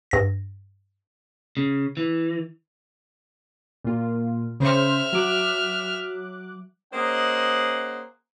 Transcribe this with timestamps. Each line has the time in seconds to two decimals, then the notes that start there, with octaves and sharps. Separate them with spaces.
0.11 G2 A#6
1.57 C#3
1.97 E3
3.84 A#2 F4
4.60 C#3 C5 E5 F6
5.13 F#3 D6 F#6
6.93 A#3 C#4 G#4 C5 D#5 F#5